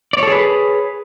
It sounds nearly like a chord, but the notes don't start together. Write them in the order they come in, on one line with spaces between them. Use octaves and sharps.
D5 C#5 A4 G#4 B4